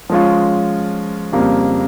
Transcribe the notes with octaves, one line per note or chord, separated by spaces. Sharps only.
F3 G#3 C#4 F4
F2 C#3 G3 A#3